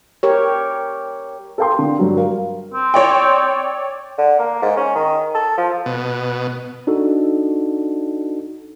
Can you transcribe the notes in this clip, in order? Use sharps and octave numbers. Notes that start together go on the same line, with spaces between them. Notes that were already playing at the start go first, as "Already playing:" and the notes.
G4 A#4 C#5
A4 A#4 F5 G5 A#5 C6
D3
G2 F#3
A#4 F5
C4
C#5 D5 G5
D3
A#3
G#2
C#4
D#3
A4
F3
B2
D4 D#4 F#4 A4